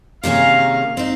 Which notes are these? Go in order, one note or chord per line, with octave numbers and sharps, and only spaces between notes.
C3 D#3 A#3 C#4 G#4 F5
C4 D#4